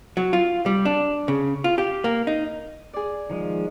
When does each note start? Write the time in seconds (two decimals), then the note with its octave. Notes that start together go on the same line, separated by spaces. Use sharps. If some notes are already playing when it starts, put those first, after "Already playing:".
0.17 F#3
0.33 F4
0.66 G3
0.85 D4
1.28 C#3
1.64 F4
1.78 G4
2.04 A#3
2.27 D#4
2.93 G#4 D5
3.30 D#3 F3 G#3